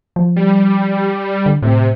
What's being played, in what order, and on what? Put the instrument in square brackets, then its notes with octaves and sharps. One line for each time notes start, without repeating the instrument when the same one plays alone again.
[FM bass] F3
[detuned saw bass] G3
[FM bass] D3
[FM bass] A2 [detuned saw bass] C3